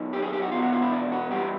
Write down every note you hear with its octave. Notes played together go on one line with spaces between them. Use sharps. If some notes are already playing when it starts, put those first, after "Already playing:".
Already playing: F#2 D#3
G4
G#4
G4
F#4
E2 B2 F4
F#4
F4
E4
D4
F#4
G2 E3 G4